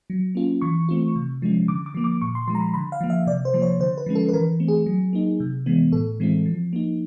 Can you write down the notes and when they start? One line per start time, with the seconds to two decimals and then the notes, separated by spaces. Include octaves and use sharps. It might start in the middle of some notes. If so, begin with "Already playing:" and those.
0.10 F#3
0.35 A#3 C#4 F4
0.62 E3 C#6
0.89 A3 C4 F4
1.16 C3
1.42 F3 G#3 C#4
1.68 D3 D6
1.86 D6
1.94 F3 A#3
2.04 D6
2.22 A#2 C#6
2.35 C6
2.48 F3 G#3 C6
2.55 A#5
2.61 B5
2.74 D3 B5
2.92 F5
3.01 F3 A#3
3.10 E5
3.27 C3 D5
3.45 C5
3.54 F3 A#3
3.62 C#5
3.80 D3 C5
3.98 B4
4.06 F3 G#3 C#4
4.15 A4
4.29 B4
4.33 E3 A#4
4.60 A3 C4
4.68 G#4
4.86 F#3
5.13 A#3 D#4
5.40 C3
5.66 E3 G#3 B3
5.92 A2 A4
6.20 E3 G#3 C4 E4
6.46 F3
6.73 A#3 D#4